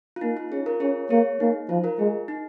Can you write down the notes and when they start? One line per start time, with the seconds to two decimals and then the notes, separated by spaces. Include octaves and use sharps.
0.16 F4
0.21 A#3 D#4
0.37 F4
0.51 C#4 G#4
0.66 F4 A#4
0.80 C#4 G#4 C#5
1.10 A#3 G#4 C#5
1.40 A#3 D#4
1.69 F3 F4
1.84 F4 A#4
1.99 G#3 G#4
2.28 D#4